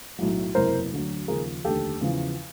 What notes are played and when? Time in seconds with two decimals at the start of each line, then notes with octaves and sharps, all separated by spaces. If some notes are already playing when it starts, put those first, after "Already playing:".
0.19 B1 A2 F#3
0.55 F#1 E2 C3 E3 A#4 C5
0.92 D2 D3 F#3
1.28 D#2 C#3 F3 G#4 A#4
1.65 F1 D#2 D3 G4 A4
2.01 E2 C#3 F3